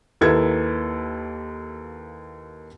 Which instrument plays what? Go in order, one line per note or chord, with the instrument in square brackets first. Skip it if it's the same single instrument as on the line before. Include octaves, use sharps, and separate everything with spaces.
[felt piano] D#2 A#3 E4 A4 B4 G#6